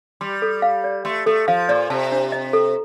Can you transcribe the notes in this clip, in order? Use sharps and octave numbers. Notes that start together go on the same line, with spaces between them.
G3 C6
A4
F5
D5
A3 C6
A3 A4
F3 F5
A#2 D5
C3 A5
D4
D#5
A4